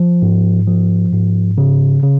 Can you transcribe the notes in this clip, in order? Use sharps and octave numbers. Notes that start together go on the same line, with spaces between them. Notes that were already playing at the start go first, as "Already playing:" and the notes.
Already playing: F3
G#2
F3
G#2
C#3
C#3